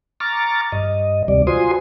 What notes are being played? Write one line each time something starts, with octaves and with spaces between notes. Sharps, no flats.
A#5 C#6 D6 F6 A6
G2 D#5
D2 C3 G3 D5
F4 F#4 C5 G#5 C6 D#6